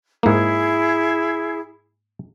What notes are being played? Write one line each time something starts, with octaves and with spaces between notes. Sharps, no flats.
G#2 A#3 E4 G#4